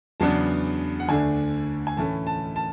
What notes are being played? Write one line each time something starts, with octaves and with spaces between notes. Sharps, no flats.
E2 C#3 F#3 B3 D4 A5
F#5
D2 D3 A3 D4 G#5
G#5
A2 E3 A3 C#4 A5
A5
A5